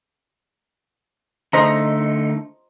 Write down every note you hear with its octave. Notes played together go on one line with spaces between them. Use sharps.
D3 A3 D#4 C5 D#5 A#5